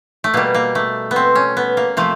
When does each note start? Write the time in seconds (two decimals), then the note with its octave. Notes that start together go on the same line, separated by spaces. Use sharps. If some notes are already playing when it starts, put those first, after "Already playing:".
0.24 A3
0.34 B2 G3 A#3
0.54 A#3
0.75 A3
1.11 B3
1.16 C4
1.35 C#4
1.57 B3
1.77 A#3
1.97 C3 F3 A3